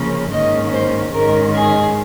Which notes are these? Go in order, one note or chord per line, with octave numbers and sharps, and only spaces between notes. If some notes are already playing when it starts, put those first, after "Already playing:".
Already playing: C#3 F3 A#3 C#4
G#2 D#3 A#3 C#4 D#5
C5
G#2 D#3 G#3 C#4 A#4
G#4